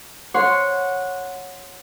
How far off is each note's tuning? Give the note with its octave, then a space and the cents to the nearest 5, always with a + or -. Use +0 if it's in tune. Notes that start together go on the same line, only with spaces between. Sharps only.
C#5 +0 F#5 -15 C6 -10